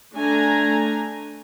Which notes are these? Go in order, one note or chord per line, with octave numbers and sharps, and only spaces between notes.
A3 D4 G#5 A#5